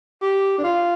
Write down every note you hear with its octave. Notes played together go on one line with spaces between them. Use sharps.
G4
D4
F4